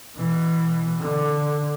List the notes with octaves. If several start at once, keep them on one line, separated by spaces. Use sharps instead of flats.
B2 E3
D3